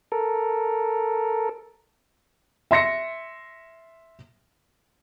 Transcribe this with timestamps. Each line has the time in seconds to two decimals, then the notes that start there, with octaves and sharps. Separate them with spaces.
0.12 A4 A#4
2.71 E5 C6 A#6 C#7